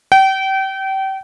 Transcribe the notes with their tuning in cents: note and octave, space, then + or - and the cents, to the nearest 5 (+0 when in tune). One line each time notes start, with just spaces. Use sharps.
G5 -30